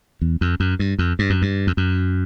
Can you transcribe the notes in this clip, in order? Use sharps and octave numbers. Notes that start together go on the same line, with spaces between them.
E2
F2
F#2
G2
F2
G2
F#2
G2
F2
F#2